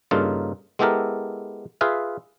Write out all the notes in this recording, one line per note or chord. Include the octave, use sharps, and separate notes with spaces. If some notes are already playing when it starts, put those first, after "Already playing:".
G2 C#3 A#3 D#4 F4 A4
G#3 B3 E4 G4 A4 A#4
F4 G#4 B4 E5 F5